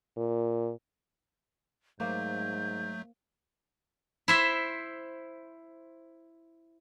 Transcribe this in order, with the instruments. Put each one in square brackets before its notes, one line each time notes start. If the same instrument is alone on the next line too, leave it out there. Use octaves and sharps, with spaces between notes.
[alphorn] A#2
[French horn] G#2 [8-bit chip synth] F#3 A3 [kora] A#3 C5 [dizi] G6
[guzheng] E4 C5 E5